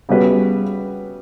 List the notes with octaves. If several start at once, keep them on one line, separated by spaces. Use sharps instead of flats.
C#3 G3 B3 F#4 B4